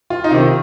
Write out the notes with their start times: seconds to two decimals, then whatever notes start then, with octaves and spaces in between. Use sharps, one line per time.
0.10 F4
0.24 D#4
0.31 C3 D#3 F4